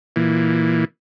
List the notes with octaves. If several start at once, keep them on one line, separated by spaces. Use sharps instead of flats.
A#2 E3